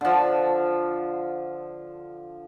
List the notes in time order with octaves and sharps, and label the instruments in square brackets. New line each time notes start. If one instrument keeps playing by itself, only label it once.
[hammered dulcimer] D3 F3